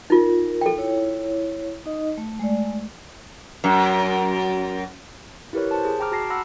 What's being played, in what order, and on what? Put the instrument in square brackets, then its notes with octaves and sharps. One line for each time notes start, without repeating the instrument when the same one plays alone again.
[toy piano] D#4 F4 [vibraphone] A#4
[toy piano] A4 G5
[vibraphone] E4 C#5
D#4 D#5
A3
G#3 A3 D5
[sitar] F#2
[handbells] E4 G4 A#4 B4 C#5
C5 A5
G#4
G5 A#5 D6 F6
F#4 A5 A#6 C7
F#5 A#5 B5 E6 A#6